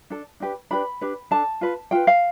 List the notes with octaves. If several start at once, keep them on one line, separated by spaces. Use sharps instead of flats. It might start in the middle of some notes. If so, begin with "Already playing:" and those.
D4 A4
D4 G4 B4
D4 G4 B4 B5
D4 G4 B4
D4 A4 A5
F4 B4
F4 B4 G5
F5